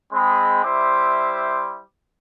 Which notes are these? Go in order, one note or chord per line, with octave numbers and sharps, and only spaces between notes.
G#3 C4 B5
G3 E4 C5 E5 C6 D6